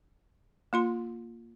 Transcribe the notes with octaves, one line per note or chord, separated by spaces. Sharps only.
A#3 F4 C6